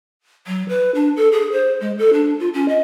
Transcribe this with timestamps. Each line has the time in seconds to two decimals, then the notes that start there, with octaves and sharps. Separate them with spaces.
0.47 F#3
0.69 B4
0.95 D4
1.17 A4
1.32 G#4
1.52 C5
1.81 G#3
1.98 A4
2.13 D4
2.40 F4
2.54 C#4
2.69 D#5